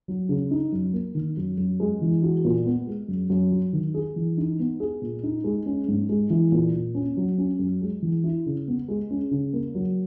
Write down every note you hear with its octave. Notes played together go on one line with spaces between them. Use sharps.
F#3
C#3
D#4
F#2
A#3
D#3
F#2
F#2
G#3
E3
F#4
A#2
B3
G#3
F#2
F#2
F#3
D#3
G#4
E3
D#4
B3
G#4
A#2
D#4
G#3
C#4
G#2
G#3
E3
A#2
A#2
C#4
F#3
C#4
F#2
G#3
E3
E4
C#3
B3
G#3
C#4
C#3
A#3
F#3